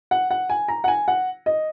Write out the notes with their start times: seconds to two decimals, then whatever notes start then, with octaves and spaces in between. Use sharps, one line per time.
0.11 F#5
0.31 F#5
0.50 G#5
0.68 A#5
0.84 F#5
0.88 G#5
1.08 F#5
1.46 D#5